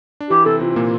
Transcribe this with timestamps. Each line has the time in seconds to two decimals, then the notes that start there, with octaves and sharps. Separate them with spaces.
0.20 D4
0.30 E3 E4 G4
0.45 C3 C4 A4
0.61 C3 C4 F4
0.71 C4
0.76 A#2 A#3